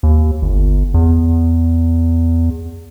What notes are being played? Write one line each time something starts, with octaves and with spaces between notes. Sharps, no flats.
D#2
G1
E2